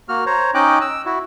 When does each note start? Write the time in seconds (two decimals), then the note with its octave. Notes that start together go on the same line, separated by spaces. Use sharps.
0.09 A#3 F#4 F6
0.26 C5 C#5 A#5
0.54 C#4 D#4 D#5 G5 D6 F#6
0.81 E6
1.06 E4 F#4